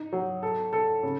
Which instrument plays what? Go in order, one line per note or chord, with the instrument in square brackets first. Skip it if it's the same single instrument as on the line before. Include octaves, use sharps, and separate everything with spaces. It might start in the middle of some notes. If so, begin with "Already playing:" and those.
Already playing: [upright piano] D#4
F#3
A4
A4
C#3